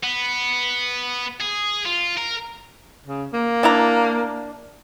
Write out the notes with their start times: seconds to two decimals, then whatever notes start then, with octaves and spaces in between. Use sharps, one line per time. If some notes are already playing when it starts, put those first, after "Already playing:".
0.03 B3
1.41 G#4
1.86 F4
2.18 A#4
3.07 C#3
3.33 A#3
3.63 D4 E4 A#5